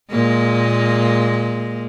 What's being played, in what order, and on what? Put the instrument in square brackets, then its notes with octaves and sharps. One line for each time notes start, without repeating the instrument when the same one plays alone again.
[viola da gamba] A#2 G#3 A#3